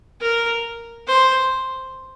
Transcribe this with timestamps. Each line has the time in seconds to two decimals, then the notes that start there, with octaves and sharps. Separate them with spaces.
0.21 A#4
1.07 C5